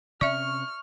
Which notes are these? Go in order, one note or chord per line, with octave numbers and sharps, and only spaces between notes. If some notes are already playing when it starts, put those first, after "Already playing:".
C3 C#4 D5 E5 C#6 F6